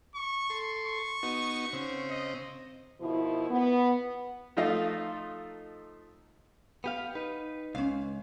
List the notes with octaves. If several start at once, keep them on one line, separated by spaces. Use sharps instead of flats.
C#6
A4 C6
C#6
B3 D#4 F#4
C#3 C4
D#5
B2 D#3 F3 E4
B3
F3 A3 D#4 F4 D#5
B3 G4 F5
D#4 B4
C#2 C#4 F5